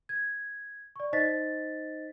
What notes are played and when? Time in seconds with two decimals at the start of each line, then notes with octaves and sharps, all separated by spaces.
0.09 G#6
0.96 D5 C#6
1.13 D#4 C5 D#5 A6 B6